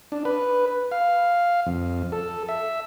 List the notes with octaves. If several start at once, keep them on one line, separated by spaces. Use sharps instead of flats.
D4
B4
F5
F2
A4
E5